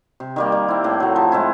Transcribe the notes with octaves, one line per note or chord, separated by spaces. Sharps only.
C3
D#3 G3 A#3
G3
C4 E4
A2
F#3 A3
F3
G#3 C4 E4